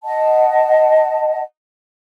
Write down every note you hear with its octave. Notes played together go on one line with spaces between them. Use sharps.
D#5 F#5 A5